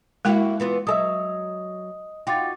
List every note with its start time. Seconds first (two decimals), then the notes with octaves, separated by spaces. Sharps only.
0.25 G#3 A#3 E4 F#4 F5 G5
0.60 E3 B3 F4
0.87 F#3 A4 D#5 E5 D#6
2.27 D#4 F4 F#4 G5 D6 A6